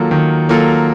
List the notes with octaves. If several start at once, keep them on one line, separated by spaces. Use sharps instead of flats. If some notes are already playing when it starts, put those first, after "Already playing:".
Already playing: D#3 F#3 A#3 F4 A4
D#3
F#3 A#3 F4 A4